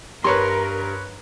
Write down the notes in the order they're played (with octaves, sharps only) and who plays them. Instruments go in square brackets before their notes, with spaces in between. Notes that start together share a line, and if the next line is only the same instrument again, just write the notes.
[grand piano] G2 [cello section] A#4 [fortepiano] B4 C#5 C6